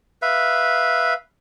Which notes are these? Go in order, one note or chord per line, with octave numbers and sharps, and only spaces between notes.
B4 E5 F5